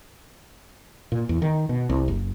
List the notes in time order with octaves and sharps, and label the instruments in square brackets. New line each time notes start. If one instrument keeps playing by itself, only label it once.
[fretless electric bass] A#2
E2
D#3
B2
C2
F#1